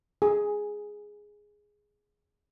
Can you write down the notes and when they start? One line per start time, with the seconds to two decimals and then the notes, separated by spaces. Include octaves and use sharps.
0.22 G#4